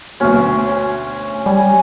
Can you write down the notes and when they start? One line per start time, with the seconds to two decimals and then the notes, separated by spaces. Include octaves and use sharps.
0.20 D2 B2 F#3 C#4
1.46 G3 G#5